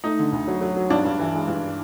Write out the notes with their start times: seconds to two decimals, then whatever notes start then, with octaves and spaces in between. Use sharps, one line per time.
0.04 A3 D#4
0.19 D3
0.32 D2
0.48 F#3
0.61 F#3
0.76 F#3
0.90 G2 D4
1.05 G2
1.19 E3
1.34 G#3
1.48 G2